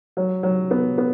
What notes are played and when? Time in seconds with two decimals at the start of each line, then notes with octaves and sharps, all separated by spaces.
0.17 F#3
0.43 F#3
0.71 B3
0.98 B3